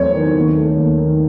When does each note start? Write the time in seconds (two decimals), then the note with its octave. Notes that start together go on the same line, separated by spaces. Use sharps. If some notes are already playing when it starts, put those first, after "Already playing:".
Already playing: E2 F#3 A3 C4 C5 C#5
0.14 D#3
0.35 D#2
0.56 A3
0.78 D#2
0.99 D#3